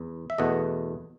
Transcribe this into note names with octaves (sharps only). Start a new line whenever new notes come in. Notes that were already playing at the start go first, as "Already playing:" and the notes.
Already playing: E2
E5
E2 B2 A3 D#5 F#5